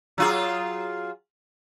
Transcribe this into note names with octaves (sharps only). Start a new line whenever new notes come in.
F#3 F4 G#4